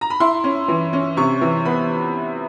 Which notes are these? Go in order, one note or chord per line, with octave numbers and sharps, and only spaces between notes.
A#5
B5
E4 C6
C#4
E3
C#4
C3 C#6
E3
B3 B5